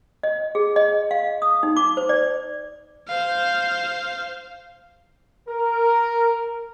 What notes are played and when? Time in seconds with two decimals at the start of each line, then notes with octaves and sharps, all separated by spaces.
0.23 D#5
0.55 G#4
0.76 D#5
1.11 F5
1.42 D#6
1.63 D#4
1.76 D6
1.97 C5
2.09 D5
3.08 C5 F5
5.48 A#4